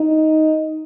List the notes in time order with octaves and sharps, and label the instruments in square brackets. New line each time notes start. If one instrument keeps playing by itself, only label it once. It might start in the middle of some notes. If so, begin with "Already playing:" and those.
Already playing: [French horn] D#4